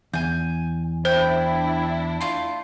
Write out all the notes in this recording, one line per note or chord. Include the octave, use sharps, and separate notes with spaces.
E2 G#5 G6
D4 E4 C5 G5
A3 F4 C6